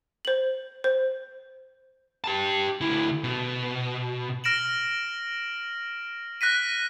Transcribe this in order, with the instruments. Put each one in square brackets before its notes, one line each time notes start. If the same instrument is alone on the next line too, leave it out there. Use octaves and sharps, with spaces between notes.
[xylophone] C5 F#7
C5
[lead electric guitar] G4 A5
D2 E4
B2
[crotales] F6 A#6 D7 E7 F#7
F#6 A#6 B6 D#7